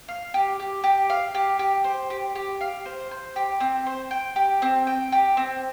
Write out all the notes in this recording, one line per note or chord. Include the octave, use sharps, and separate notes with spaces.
F5
G4
G4
G4
F5
G4
G4
C5
G4
G4
F5
C5
C5
G4
C4
C5
G5
G4
C4
G5
G4
C4